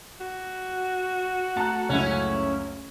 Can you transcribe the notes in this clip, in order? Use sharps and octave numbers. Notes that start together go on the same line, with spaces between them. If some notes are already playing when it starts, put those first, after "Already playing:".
F#4
A3 A5 A#5 F#6
C#2 F#2 C#4 E4